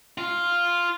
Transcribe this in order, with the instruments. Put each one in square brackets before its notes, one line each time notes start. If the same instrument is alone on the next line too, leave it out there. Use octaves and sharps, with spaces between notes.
[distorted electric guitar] F4